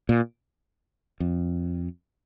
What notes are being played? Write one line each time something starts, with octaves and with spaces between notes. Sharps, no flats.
A#2
F2